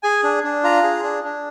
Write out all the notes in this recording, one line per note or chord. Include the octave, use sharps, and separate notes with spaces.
G#4 G#5
D4
D4
F4 A#5
G#4
D4
D4